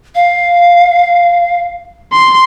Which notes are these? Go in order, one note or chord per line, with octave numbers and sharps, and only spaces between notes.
F5
C6